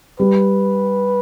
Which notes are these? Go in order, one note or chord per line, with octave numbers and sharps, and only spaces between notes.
G3 B4